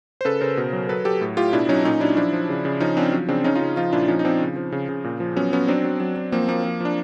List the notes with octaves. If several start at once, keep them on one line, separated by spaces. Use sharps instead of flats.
C5
C#3 A4 B4
C#3 A#4 C5
B2
F#3
F#3 A4 B4
F#3 G4 A4
A2
A2 F4 G4
B2 D4 E4
F#3 C#4 D#4
A#2 C#4 D#4
F#3 D4 E4
F3 D4 E4
F3
C#3
C#3
F3 C#4 D#4
F3 C4 D4
F#3
C#3 C4 D4
C#3 C#4 D#4
D#4 F4
C#3
F3 D#4 F4
A#2 D4 E4
F3 C#4 D#4
D#4
F3 C4 D4
C#3
F3
C#3
C#3
A#2
F3
F#3 B3 C#4
F#3 B3 C#4
F#3 C4 D4
F#3
F#3
F#3
F3 A#3 C4
F3 A#3
F3
F3 D4